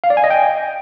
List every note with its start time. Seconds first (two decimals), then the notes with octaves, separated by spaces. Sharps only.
0.04 F5
0.10 D5
0.17 G#5
0.24 D#5
0.30 G5